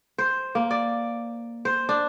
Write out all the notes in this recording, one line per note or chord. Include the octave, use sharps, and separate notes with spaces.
C5
A#3
D5
C5
D4